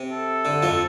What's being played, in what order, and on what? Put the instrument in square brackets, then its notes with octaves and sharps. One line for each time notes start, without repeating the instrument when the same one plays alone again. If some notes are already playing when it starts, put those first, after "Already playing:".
Already playing: [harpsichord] C3
[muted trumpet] A4
[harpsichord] D3
F2 F3